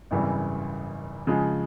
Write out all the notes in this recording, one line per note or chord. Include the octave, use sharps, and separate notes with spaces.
G#1 F#2 C#3 E3 G3
C#3 F3 G#3